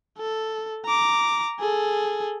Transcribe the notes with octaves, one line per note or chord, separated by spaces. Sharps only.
A4
A#5 D6
G#4 A4